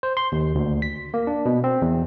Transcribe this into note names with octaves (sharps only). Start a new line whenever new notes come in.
C5
C6
D#2
D2
B6
A#3
D4
B2
C4
E2